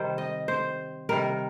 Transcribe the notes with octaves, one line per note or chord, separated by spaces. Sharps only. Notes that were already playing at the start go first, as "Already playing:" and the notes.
Already playing: C3 D#3 G3 C5
D#5
C5
C3 D#3 G3 A#4